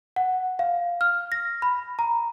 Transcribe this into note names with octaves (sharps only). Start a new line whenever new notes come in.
F#5
F5
F6
A#6
B5
A#5